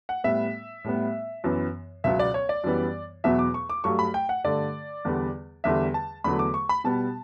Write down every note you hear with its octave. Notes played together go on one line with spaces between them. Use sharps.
F#5
A2 G3 B3 E5
A2 G3 B3
F#2 E3 B3
C#2 B2 F#3 B3 E5
D5
C#5
D5
F#2 E3 G3 B3
E2 B2 F#3 B3 E5
D6
C#6
D6
G2 F#3 A3 C#6
B5
G5
F#5
G2 D3 A3 D5
E2 D3 G3 B3
E2 D3 G3 E5
A5
E2 D3 F#3 A3 B5
D6
C#6
B5
B2 G3 B3 A5